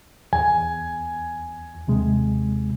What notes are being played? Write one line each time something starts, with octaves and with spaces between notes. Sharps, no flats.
E2 G#5
D#2 C3 G#3